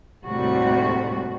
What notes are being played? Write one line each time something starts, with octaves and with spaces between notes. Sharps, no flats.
D#2 A2 C3 G3 A3 F#4